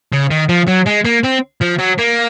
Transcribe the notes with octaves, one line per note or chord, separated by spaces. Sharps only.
C#3
D#3
F3
F#3
G#3
A#3
C4
F3
F#3
A#3